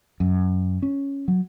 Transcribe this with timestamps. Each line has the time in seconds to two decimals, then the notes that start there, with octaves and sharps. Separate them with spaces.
0.20 F#2
0.82 C#4
1.28 F#3